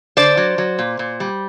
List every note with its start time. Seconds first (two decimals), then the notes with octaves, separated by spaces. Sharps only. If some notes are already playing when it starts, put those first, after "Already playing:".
0.17 D3 C5 D5
0.37 F#3
0.58 F#3
0.79 A#2
0.99 A#2
1.20 G3